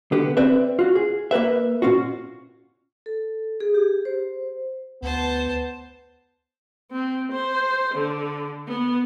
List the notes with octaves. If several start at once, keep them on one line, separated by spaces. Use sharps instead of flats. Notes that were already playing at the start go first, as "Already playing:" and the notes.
D3 B3 G4
C4 B4 D5 E5
F4 F#4
G#4
A#3 A#4 B4 E5
A#2 C#4 F4 F#4
A4
G#4
G4
C5
D2 B3 C5 A5
C4
C5
D3
B3